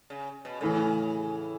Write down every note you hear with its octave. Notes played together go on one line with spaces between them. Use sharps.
C#3
B2
A2 C#3 E3 A3